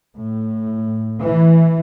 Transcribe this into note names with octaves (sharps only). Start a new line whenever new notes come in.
A2
E3